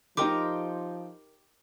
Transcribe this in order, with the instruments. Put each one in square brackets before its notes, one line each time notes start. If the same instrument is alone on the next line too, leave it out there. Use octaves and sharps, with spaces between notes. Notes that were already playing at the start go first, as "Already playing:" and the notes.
[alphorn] F3 [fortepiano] D#4 G5 C6 [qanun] G4 A#4 D#5 [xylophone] D6